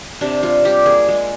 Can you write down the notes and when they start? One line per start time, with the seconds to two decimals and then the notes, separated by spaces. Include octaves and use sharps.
0.21 C3 D4
0.42 G3 F4
0.65 G3 G4
0.86 A#3 G#4
1.09 G#3